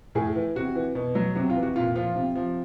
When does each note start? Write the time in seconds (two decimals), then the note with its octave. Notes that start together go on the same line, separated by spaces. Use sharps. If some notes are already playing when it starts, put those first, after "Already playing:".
0.15 A2 G#4
0.36 E3
0.56 C3 F#4
0.75 E3
0.95 B2
1.15 F#3
1.35 C3 F#4
1.50 F4
1.56 E3
1.63 F#4
1.76 A#2 F4
1.95 F3 F4
2.16 C3
2.36 F3